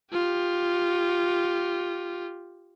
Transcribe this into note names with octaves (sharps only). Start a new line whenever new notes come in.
F4 G4